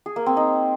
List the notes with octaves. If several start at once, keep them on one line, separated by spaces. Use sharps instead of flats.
G#4
A#3
C4
D#4